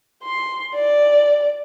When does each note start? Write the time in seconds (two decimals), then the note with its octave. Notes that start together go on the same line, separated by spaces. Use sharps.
0.24 C6
0.75 D5